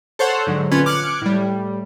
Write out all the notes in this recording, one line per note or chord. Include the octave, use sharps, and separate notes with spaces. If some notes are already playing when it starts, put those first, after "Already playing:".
A4 C5 C#5 F#5
G#2 D3 F#3
A#1 D3 C#4 F4 B4 G#6
D6 F6 F#6 G#6 C#7
A2 G3